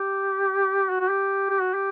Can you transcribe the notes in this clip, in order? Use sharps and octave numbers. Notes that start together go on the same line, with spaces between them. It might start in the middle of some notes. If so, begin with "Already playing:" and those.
Already playing: G4
F#4
F#4
G4
G4
F#4
G4